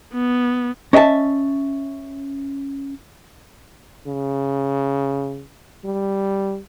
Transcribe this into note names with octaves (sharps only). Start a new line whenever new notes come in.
B3
C#4 D#5 E5 G5 A5
C#3
G3